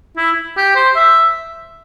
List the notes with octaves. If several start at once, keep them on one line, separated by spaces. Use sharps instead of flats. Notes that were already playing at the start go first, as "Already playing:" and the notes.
E4
G4
C5
E5